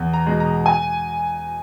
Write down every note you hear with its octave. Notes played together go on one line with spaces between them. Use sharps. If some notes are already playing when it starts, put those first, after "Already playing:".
Already playing: E2
A#5
B2 G#3
A#5
G#5